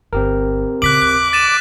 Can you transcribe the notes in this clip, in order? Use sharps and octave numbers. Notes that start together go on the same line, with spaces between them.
G1 C4 G4 A#4
A#2 C#3 D6 F#6 B6 F#7
D#2 F#6
A6 D#7 E7